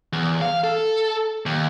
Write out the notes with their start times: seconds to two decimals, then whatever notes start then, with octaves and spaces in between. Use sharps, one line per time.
0.13 E2
0.41 F5
0.64 A4
1.46 D#2